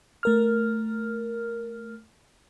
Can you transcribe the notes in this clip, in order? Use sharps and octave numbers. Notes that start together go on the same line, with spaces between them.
A3 A#4 F6